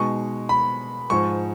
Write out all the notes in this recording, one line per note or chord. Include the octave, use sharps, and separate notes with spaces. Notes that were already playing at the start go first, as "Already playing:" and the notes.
Already playing: B2 G#3 D#4 C#6
B5
G#2 F3 G#3 C#6